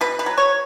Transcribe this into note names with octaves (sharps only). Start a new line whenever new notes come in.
B2 B4
B4
F#3
C#5